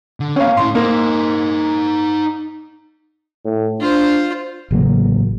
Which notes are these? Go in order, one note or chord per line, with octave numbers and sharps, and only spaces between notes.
D3
A#3 C4 C#4 F5
A2 E4 C6
A#3 D#4 C5
A2
D4 F4 C5
A1 C#3 F#3 A#3